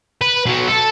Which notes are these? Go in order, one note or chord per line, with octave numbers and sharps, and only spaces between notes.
B4
B2 F#3
A4